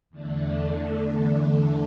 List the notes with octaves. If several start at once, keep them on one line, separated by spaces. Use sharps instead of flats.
E2 D3 A3 D4